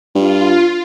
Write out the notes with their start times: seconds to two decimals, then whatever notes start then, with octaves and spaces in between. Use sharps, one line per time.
0.15 G2 F4